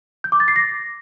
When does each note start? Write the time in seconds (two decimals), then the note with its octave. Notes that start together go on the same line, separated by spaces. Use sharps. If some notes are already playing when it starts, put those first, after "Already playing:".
0.24 G6
0.32 D6
0.40 A6
0.48 C7
0.56 A#6